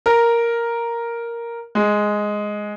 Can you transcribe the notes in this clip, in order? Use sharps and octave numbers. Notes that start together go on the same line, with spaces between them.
A#4
G#3